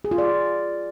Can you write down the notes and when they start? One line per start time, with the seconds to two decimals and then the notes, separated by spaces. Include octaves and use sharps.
0.04 G#4
0.11 F4
0.18 D5